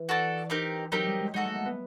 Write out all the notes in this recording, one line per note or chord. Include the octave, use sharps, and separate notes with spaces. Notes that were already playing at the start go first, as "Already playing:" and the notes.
Already playing: E3
F#4 A4 D5
C4 D#4 G4 A#4
F#3 C4 D#4 G4 A#4
G3
G#3
G#3 D#4 F#4 A4
A3
A#3
B3